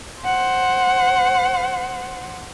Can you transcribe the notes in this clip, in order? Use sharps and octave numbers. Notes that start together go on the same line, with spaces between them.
C5 F#5